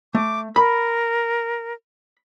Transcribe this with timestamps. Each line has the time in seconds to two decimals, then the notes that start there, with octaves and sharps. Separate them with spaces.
0.15 A3 D6
0.56 A#4 B5